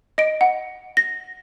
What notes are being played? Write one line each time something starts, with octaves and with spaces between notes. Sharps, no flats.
D#5 D7
F#5
A#6